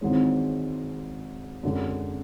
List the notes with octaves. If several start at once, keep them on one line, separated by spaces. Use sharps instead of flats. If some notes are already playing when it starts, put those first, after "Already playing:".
G#1 G#2 E3 G#3 C#4
F#2 D3 G#3